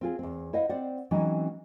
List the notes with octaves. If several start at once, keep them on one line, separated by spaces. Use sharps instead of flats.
C4 F4 G#4
E2 C4
E4 C5 D#5 F5 F#5
C4 C5 D5 F#5
E3 F#3 G#3 C4 C#4 D#4